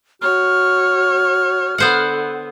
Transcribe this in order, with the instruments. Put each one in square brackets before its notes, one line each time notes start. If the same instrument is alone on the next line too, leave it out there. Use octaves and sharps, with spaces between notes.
[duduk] F#4 [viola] C#5 [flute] F6
[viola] D3 [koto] B3 C5 F#5